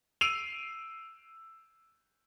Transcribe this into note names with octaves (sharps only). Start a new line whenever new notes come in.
E6 C7 D7 D#7 F7